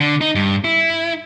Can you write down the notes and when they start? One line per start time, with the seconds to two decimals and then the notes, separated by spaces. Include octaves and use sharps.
0.01 D3
0.21 D#4
0.35 G2
0.64 E4